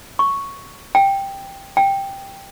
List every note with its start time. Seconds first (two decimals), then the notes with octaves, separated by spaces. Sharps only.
0.19 C#6
0.95 G5
1.77 G5